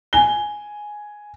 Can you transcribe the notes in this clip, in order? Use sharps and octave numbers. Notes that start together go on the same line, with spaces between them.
G#5 G7